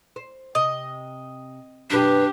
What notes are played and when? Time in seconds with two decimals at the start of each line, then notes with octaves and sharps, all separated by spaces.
0.16 C5
0.55 C3 D#5
1.90 F#2 B2 D4 G4 B4